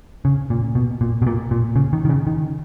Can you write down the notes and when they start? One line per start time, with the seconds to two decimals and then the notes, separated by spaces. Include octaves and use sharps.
0.25 C#3
0.50 A#2
0.75 B2
1.01 A#2
1.22 B2
1.27 A#2
1.51 A#2
1.76 C#3
1.93 D#3
2.05 D#3
2.09 C#3
2.27 D#3